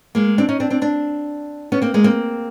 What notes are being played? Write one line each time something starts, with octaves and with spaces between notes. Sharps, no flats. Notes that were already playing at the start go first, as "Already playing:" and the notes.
G#3 A#3
C4 D4
C#4 D#4
C4 D4
C4 D4
C4 D4
B3 C#4
A#3 C4
G#3 A#3
A#3 C4